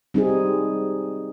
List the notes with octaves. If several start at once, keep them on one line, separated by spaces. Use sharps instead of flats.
G3 C4 D#4 G#4